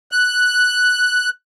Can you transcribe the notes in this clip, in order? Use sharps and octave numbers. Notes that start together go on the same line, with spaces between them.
F#6